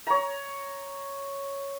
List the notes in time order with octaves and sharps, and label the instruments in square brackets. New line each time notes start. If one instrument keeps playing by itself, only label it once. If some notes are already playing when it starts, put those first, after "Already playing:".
[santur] C#5 A#5